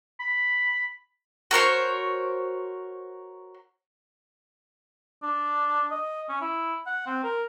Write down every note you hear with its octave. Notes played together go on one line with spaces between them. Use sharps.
B5
F#4 A#4 C5 C#5
D4
D#5
C#4
E4
F#5
C4
A#4